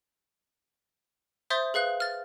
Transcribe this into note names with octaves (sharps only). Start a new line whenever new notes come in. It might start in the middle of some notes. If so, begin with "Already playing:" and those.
C5 E5 C6 D#6 G6 A6
G#4 B4 F5 F#6
F6 A6